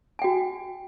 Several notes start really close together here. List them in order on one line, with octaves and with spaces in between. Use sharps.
G#5 G5 F#4